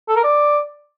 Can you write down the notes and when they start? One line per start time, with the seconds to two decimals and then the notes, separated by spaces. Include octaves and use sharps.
0.08 A4
0.16 A#4
0.24 D5